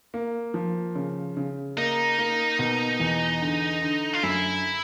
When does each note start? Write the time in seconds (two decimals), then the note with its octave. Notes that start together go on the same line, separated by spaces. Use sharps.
0.14 A#3
0.54 F3
0.95 C#3
1.37 C#3
1.77 A#3 D#4
2.19 A#3
2.59 B2
3.00 E2
3.41 D3
3.81 D3
4.13 F4
4.23 F#2 E4